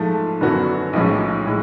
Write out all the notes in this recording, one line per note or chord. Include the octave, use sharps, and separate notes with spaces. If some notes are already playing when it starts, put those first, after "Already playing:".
Already playing: G#2 F3 A3
F#2 D3 F#3 B3 F#4
B1 A2 F3 G#3 C#4
A2 G#3